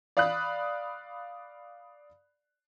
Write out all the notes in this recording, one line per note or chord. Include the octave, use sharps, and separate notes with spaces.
D5 F5 B5 D#6 F#6